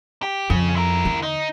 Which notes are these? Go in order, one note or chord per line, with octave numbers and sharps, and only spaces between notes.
G4
F2 C#3
E4 A#4
E2 D3
D#4